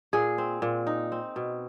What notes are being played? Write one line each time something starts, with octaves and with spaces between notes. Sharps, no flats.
A#2 G#4
C4
A#2
D#4
C4
B2